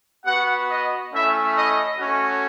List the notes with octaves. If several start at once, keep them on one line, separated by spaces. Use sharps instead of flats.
B3 F#4 F#5
D#5
A3 C#4 E4 E5
D#5
A3 C#4 F#4